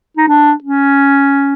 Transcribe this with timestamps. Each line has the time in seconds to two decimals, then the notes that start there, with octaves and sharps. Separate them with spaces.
0.17 D#4
0.28 D4
0.64 C#4